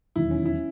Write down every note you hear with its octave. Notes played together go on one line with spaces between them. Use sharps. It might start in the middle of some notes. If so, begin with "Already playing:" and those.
E1 D#2 D#3 F#3 E4
C#4
E4